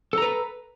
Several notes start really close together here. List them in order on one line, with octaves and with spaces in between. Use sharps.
A4 A#5 B4